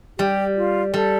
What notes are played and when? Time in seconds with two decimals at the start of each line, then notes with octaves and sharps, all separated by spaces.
0.19 G3 G4
0.57 F4
0.93 G3 A4